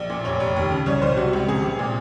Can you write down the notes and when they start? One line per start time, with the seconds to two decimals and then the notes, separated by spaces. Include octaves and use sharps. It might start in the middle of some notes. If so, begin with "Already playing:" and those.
Already playing: A#1
0.10 A#2
0.25 F1 C#5
0.40 F1
0.56 D#2
0.71 C#3
0.86 C2 C#5
1.02 C2 C5
1.17 C3 F#4
1.33 C#2
1.49 C3 G#4
1.63 C3
1.79 A#2